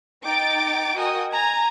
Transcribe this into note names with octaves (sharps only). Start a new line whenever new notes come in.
D#4 G5 D6 A6 D7
F#4 A#4 D#5 G5 G#5 D#6
G#5 A#5 G#6 A#6